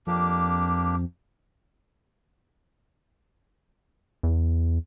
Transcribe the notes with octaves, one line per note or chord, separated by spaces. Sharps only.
F2 A#3 D4 G4
E2